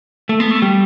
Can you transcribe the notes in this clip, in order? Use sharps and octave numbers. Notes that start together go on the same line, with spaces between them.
A3
B3
A3
G3